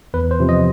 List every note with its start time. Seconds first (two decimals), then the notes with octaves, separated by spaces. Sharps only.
0.14 E2 B4
0.31 C5
0.40 C3 F3
0.49 D#5